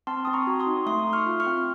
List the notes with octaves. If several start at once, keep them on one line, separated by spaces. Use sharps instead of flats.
C4 A5 C6
C4 D#6
A#5 C#6
F#4
C6 D#6
D#4
A3 C6 D#6
A3
C#6 F6
F4
C#6 F6
C4